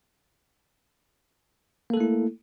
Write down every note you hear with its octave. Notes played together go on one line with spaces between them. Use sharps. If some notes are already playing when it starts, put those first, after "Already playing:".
A3 A#3 E4 A4